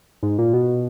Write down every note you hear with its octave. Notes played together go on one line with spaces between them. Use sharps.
G#2
A#2
B2